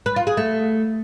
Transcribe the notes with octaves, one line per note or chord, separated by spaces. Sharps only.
B4
F4
G#4
A3